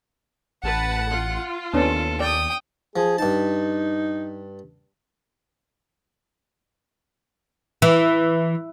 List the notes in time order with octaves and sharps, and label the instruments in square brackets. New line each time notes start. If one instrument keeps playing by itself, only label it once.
[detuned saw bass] A1 [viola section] B4 A5 [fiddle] F#5
[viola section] F4
[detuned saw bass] D#2 [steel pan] B3 C#4 D4 [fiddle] A4
[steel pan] D5 [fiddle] G5 D#6
[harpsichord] F3 [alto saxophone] G#4
[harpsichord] G2 A5 [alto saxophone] D#4
[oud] E3